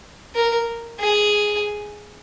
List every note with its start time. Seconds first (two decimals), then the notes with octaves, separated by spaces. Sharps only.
0.35 A#4
1.00 G#4